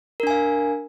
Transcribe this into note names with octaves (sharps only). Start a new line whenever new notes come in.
D4 A#4 F5 G#5